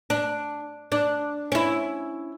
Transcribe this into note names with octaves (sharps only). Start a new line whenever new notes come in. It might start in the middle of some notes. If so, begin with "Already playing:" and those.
D4
D4
C#4 E4